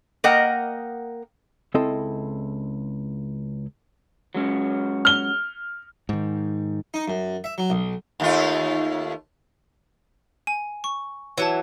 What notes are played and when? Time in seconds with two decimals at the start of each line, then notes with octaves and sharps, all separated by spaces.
0.24 A#3 A#4 D#5 F#5 G5
1.74 C#2 C4 E4 A4 D#5 C6
4.35 F#3 G#3 C#4
5.05 F6 G7
6.09 G#2 D#3
6.94 D#4
7.08 F#2
7.44 E5
7.58 F#3
7.70 B1
8.20 D#2 A3 F4
10.47 G#5
10.84 C#6
11.38 E3 F#3 C#5 F#5 A5